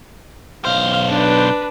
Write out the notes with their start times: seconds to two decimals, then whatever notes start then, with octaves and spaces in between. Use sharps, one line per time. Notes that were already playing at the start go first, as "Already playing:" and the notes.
0.65 B1 C5 F5
1.09 D4 B4